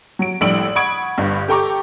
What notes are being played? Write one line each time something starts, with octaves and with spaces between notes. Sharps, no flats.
F#3 D7
A#1 A2 G3 E6 D7 F#7
F#5 B5 C#6 D#6 G#6 D7
G1 G2
G4 A4 G5 A#5 C#6 D6